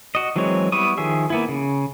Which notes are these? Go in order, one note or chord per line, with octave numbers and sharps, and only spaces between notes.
F#4 D#5
E3 F#3 G#3 C4 C#5
G3 B3 E4 C#6 D#6
D#3 F3 G#4 E5
A#3 B3 E4
C#3